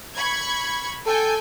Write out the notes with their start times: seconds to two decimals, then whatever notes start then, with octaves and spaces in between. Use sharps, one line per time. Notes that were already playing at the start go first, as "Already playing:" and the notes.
0.16 B5 C#6 G#6
1.06 A4 G5 G#5 G6